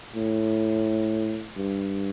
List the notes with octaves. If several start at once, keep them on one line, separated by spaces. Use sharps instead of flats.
A2
G2